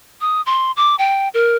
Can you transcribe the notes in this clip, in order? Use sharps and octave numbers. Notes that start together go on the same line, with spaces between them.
D#6
C6
D6
G5
A#4